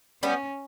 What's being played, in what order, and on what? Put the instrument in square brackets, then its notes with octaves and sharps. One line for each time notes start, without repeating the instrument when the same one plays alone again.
[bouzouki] G3 B3 [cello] C#4